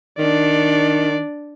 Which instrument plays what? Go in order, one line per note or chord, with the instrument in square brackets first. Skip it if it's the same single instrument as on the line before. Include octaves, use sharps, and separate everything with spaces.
[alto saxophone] D#3 [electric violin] D4 D5